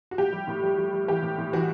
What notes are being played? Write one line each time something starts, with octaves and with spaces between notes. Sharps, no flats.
F#4
A2 G4
G3
A2
G3
G3
G3
E3 G4
A2
A2
E3 F#4